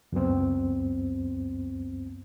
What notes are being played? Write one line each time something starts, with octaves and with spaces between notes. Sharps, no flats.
C#2 F#2 B3 C4